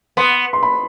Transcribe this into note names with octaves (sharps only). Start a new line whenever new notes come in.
B3 C6
C6
B5